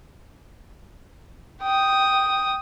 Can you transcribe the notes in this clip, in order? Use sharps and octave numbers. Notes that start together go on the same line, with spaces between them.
G5 D#6